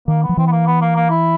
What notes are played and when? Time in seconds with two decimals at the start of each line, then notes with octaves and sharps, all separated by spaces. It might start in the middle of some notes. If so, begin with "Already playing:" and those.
0.08 D#3 A#3
0.23 B3
0.29 F3
0.37 E3 C4
0.47 B3
0.52 A#3
0.67 B3
0.82 A#3
0.96 A#3
1.11 E4